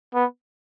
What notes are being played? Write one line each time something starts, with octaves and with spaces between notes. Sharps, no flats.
B3